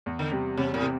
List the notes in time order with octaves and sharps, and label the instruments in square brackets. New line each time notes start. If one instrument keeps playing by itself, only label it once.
[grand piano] E2
[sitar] D3
[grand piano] C3 G3
[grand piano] E2 [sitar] C3
[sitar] A2
[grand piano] C3